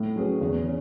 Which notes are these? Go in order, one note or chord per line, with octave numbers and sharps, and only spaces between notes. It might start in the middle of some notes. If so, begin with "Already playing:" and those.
Already playing: A2
F#3 C#4 G#4 B4
E2
C#4